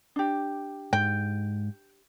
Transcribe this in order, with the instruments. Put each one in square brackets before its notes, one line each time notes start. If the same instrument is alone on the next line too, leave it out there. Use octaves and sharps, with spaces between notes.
[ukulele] D4 G4
[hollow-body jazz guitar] G#2 [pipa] G5